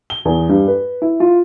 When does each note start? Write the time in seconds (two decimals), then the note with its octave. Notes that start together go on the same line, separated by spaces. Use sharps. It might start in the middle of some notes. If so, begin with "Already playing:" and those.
0.10 G7
0.25 E2
0.49 G2
0.68 B4
1.02 E4
1.20 F4